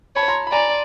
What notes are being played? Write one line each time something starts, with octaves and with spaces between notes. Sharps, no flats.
C#5 A5 B5
A#5 C6
B5
D5 G#5 A#5